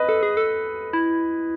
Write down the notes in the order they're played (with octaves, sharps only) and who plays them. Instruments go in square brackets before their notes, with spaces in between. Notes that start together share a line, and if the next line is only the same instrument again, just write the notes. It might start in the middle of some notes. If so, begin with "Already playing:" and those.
Already playing: [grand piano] B4 D#5
[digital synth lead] A4
G#4
A4
E4